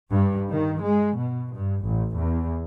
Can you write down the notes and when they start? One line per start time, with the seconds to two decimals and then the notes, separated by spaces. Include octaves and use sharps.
0.11 G2
0.51 D#3
0.83 G#3
1.18 B2
1.55 G2
1.85 A1
2.17 E2